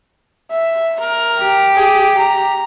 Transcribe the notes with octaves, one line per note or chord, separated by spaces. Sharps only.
E5
A#4
G4
G#4
A#5